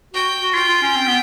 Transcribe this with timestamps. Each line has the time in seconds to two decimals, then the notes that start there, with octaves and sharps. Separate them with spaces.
0.14 F#4 G5
0.42 F#4
0.54 F4 G5
0.68 F4
0.82 C#4
0.96 C4
1.07 B3